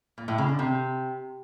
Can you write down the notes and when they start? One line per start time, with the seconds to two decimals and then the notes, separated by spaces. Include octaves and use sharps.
0.18 A#2
0.28 A2
0.38 C#3
0.49 D3
0.59 C3